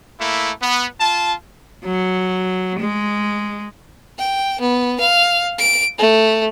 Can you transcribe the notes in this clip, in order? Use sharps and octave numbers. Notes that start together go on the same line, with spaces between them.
A3 A#3 E4
B3
F4 A5
F#3
G#3
G5
B3
F5
D7
A3